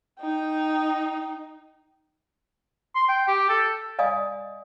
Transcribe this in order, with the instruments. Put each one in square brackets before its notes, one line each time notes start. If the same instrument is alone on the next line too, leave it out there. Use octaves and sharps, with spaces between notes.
[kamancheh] D#4 G5
[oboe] C6
G5
G4
A4
[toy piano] D5 D#5 F5 G#5 D#6